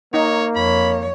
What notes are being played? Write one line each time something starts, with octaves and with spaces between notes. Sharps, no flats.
A#3 D#4 C#5
F2 C#5 B5